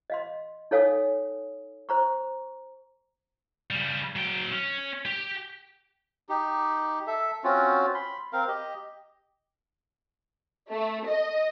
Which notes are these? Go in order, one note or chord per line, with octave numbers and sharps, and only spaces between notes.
D#5 F5 C6
D#4 A4 C#5 F5 G#5 D#6
C5 A#5 C#6
C#3 G3
F#3 G5
C#4
G4
D#4 G4
A4 E5
C4 C#4 F4 F#4
B5 C6
C4 A#4 F5
G4 D#5
A3
D#5